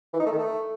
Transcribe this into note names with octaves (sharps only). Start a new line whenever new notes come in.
E3
D#4
A3
D#3
A3